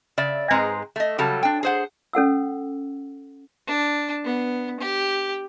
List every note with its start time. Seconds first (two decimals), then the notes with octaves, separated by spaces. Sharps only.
0.18 C#3 D5 E5
0.51 G#2 G#3 C4 G#4 B4 A#5
0.96 A3 D#5
1.18 C#3 F#3 G3 A4 A5
1.43 D4 G5
1.63 G#4 C5 F#5
2.13 C#4 A4 F#5 E6
3.67 D4
4.24 B3
4.80 G4